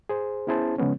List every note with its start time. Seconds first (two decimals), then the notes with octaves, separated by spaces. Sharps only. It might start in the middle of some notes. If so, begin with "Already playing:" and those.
0.09 G#4 C5
0.47 B3 C#4 E4 G#4 C5 A5
0.78 C#3 F3 G#3 B3 C#4